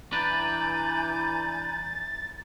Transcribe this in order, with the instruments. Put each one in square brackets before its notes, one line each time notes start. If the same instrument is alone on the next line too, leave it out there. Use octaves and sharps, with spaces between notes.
[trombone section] E3 [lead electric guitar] D4 B4 [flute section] G#5 A#5 G6 [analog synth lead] A6